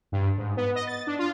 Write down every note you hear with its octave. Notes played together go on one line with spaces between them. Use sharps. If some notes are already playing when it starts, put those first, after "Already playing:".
G2
G#2
B3
D#5
A6
D4
F4